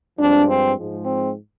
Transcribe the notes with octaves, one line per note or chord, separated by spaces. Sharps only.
G2 F3 G#3 C4 D4
C4
G#2 F3 G#3
C4